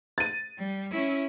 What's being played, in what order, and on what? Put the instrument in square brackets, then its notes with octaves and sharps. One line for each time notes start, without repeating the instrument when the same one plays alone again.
[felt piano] A6 D#7
[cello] G3
C#4 E4